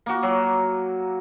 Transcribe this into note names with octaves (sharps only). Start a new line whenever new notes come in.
A#3 F#4
F#3